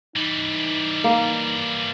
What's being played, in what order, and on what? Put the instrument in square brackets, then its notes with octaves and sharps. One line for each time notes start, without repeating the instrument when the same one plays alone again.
[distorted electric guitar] E3 G3 [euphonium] D#4
[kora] A#3